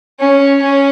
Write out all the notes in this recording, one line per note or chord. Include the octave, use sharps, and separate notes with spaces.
C#4
C#4